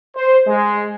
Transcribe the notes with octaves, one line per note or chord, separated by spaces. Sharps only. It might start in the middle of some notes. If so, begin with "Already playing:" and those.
C5
G#3